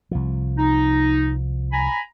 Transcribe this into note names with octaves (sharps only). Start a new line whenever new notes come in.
C2 F3
D#4
G#5 A#5 B5